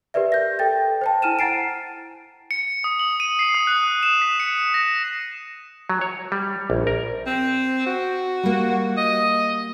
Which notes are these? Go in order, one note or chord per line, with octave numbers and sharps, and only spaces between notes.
G4 A#4 B4 D5 E5
G6 A#6
A4 G5 A6
C5 G5 A5
E4 G#5 F6 D#7 E7
F#5 A#5 A6 C7 D7
C#7
D#6
F#7
D#7
C7
D#6
F#6
E7
B6
C#7
A#6
F#3
C#5
G3
A#1
A#4
C4
F#4
G3 A#3
D#5